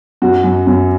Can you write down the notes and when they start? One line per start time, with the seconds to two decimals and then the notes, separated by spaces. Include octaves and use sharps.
0.22 F#2 F#4
0.44 F#2
0.67 F#2